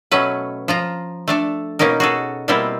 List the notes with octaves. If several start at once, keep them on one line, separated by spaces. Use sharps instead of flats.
B2 F#3 A3 C#4 B4
F3 F4 A#5
A3 D4 A4
B2 A#3 C#4 D#4 A#4
F#4 G#4 A4
B2 G3 A#3 C4 E4 F4